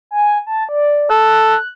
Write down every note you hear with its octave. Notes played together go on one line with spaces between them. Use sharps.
G#5
A5
D5
A4 F#6